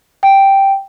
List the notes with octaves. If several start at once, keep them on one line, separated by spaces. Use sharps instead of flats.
G5